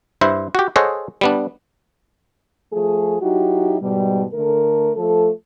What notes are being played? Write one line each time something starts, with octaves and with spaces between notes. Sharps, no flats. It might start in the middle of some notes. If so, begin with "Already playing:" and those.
G2 E4 C5
F#4 G4
G#4 A4 C5 C#5 D#5 F#5
G3 B3 D4
F3 A3 G#4
F#3 D#4 E4 F#4 G4
G#2 B2 G3
D3 A3 A4 A#4
F3 A3 A4